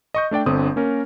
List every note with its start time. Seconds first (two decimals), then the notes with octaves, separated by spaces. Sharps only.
0.14 D#5 C#6 G6
0.31 A3 D4 D5 G5
0.46 G1 D3 C4 D#6
0.76 A#3 C#4 A#4